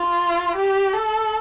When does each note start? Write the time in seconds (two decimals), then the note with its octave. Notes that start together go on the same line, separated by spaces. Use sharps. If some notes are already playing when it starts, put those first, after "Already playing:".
Already playing: F4
0.56 G4
0.93 A4